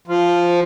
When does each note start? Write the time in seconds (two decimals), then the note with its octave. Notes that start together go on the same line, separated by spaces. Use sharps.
0.08 F3